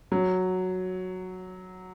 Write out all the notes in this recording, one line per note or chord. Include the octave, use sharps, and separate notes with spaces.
F#3